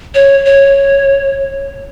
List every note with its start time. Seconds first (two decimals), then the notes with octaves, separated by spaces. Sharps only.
0.15 C#5
0.46 C#5